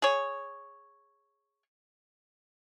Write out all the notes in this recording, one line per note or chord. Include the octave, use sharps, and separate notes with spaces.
G#4 C#5